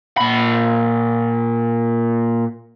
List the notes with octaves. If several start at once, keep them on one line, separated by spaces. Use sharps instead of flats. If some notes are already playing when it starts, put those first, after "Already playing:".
A#2 B5